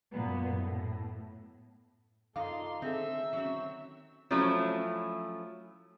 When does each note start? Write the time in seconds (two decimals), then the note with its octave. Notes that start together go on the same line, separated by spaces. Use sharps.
0.12 F#2 A#2 B3
0.55 A2
2.36 D#3 D#4 F4 A4 F5 C6 D6
2.82 D3 C4 D#4 G#4 A4 E5 E6
3.33 D#3 F#3 C4 C#4
4.31 F3 F#3 A3 C#4 E4